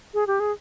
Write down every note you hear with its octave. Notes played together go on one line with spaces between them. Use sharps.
G#4
G4
G#4